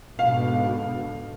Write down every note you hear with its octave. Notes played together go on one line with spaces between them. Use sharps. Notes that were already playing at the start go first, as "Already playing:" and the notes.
G#2 B2 D3 F5